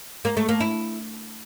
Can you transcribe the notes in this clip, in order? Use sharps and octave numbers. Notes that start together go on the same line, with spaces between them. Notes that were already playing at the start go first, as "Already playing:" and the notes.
A#3
A3
A#3
E4